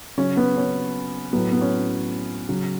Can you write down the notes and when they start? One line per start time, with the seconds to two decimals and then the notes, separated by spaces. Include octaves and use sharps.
0.17 C#3 F#3 C#4
0.37 B3
0.57 C#4
1.33 A2 F#3 B3
1.53 B3
1.61 C#4
2.49 C#3 F#3